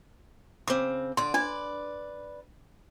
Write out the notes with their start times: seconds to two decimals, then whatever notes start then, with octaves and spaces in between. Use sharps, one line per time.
0.68 C#3 C4 D6
1.17 D3 D5 C6
1.34 D4 B4 D5